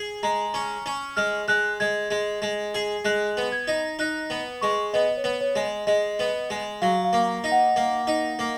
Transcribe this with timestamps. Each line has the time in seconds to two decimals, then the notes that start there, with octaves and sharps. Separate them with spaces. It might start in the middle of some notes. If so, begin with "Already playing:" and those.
Already playing: G#4
0.23 G#3 A#5
0.54 C#4
0.86 C#4
1.16 G#3 F6
1.48 G#3 F#6
1.80 G#3 G#6
2.11 G#3
2.42 G#3
2.74 G#4
3.05 G#3 F#6
3.37 B3
3.52 G#6
3.68 D#4
3.99 D#4 F#6
4.30 B3
4.61 G#3 C#6
4.94 B3 D#5
5.17 C#5
5.24 B3
5.41 C#5
5.56 G#3
5.64 D#5
5.87 G#3 D#5
6.19 B3
6.50 G#3
6.82 F#3 F5
7.05 F5
7.13 A#3
7.44 D#4
7.52 F#5
7.76 A#3
8.07 D#4
8.39 A#3